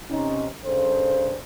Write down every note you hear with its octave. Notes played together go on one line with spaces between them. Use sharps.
C3 C#4 D#4
G2 C#3 A4 C5